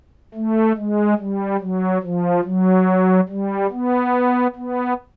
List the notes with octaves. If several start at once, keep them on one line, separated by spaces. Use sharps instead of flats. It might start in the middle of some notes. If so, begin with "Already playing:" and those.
A3
G#3
G3
F#3
F3
F#3
G3
B3
B3